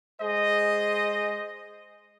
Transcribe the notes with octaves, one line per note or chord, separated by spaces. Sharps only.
G#3 G#4 C5 D#5